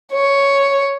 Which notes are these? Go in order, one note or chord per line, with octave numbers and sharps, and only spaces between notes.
C#5